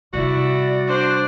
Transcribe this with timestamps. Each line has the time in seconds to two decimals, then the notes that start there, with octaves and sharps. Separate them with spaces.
0.13 C3 G3 E4 F#4 D5
0.88 D4 C5 D5